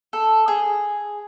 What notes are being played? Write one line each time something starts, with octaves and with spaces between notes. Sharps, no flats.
A4
G#4